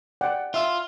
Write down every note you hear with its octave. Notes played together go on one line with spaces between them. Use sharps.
D5 F#5 G5
F4 E5 E6